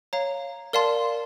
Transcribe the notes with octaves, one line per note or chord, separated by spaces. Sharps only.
C#5 F5 A#5
A#4 D5 F5 A5 C6